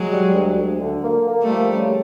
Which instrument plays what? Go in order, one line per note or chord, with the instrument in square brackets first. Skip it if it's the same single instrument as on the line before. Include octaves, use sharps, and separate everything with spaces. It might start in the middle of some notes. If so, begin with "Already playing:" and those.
Already playing: [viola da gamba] F#3 G#3
[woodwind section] G3
D2
D2
D3
A#3
A#3
[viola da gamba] G3 A3
[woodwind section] F3
C#3